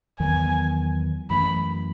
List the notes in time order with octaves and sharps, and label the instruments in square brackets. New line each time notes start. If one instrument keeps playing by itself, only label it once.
[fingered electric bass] E2 D#3 F#3 B3 [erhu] G#5
[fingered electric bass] F#2 E3 A3 C#4 [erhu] B5